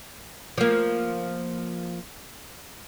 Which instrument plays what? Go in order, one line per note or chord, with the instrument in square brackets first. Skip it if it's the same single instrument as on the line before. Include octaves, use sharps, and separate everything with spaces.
[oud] F3 A#3